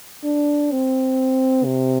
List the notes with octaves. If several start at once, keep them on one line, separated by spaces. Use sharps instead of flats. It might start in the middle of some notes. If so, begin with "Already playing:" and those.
D4
C4
C3